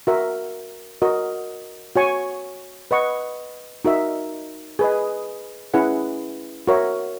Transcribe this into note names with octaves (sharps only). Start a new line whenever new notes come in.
F#4 A#4 E5
F#4 A#4 D#5
F#4 C#5 G#5 C#6
B4 D#5 F#5 C#6
D#4 F#4 A#4 E5
G#4 B4 D#5
C#4 E4 G#4 B4 F#5
F#4 A#4 C#5 E5